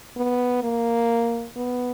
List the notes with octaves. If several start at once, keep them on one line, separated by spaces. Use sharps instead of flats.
B3
A#3
B3